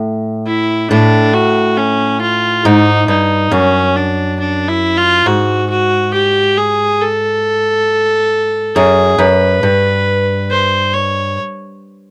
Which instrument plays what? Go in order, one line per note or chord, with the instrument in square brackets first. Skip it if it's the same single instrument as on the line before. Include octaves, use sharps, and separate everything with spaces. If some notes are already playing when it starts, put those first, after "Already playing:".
Already playing: [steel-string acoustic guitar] A2
[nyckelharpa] E4
[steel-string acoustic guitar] A2 [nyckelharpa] D4
[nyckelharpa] F#4
C#4
F4
[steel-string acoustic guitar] G#2 [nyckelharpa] D#4
[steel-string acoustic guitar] G2 [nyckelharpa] D#4
[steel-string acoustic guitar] F#2 [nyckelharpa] C#4
[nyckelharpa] D4
D4
E4
F4
[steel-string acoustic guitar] G#2 [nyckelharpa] F#4
[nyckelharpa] F#4
G4
G#4
A4
[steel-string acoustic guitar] F#2 [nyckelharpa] G#4
[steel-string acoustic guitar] F#2 [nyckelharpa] B4
[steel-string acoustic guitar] G2
[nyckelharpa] C5
C#5